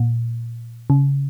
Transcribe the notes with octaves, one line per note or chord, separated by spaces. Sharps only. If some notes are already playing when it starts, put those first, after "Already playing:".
Already playing: A#2
C#3